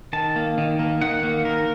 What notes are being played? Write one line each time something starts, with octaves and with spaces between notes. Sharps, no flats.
D#3 A5
A#3
D#3
A#3
D#3 F#5
A#3
D#3 A#4